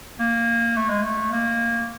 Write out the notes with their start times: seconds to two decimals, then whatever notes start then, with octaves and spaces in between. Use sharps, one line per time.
0.20 A#3
0.76 A3
0.90 G#3
1.03 A3
1.32 A#3